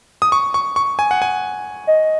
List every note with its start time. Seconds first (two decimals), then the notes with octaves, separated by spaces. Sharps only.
0.22 D#6
0.32 C#6
0.54 C#6
0.76 C#6
0.99 G#5
1.11 F#5
1.22 G#5
1.87 D#5